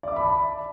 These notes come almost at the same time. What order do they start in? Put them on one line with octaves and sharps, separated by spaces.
D5 D6 E5 B5 A5